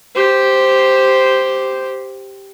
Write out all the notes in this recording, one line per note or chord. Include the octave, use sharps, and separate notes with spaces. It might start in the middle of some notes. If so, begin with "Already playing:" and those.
G4 C5